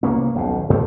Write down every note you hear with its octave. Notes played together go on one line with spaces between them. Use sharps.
C2 A#3 B3 C#4
D#1 B1 F2 B2
D2 G2 A3 C4